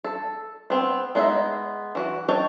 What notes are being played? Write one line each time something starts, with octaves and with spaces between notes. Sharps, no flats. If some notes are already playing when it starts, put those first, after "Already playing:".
A4
B3 C4
G#3 B3 D#4 D#5 E5
E3 F#4
C#5 D#5 G5 A5